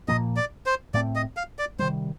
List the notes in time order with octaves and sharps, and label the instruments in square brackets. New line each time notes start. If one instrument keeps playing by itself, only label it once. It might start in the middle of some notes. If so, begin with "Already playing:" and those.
[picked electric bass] A#2 F3 A#3 [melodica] D#5
[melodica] D5
C5
[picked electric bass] A2 A3 C4 [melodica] D5
[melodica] D#5
F5
D5
[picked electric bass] C3 D#3 G3 [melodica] C5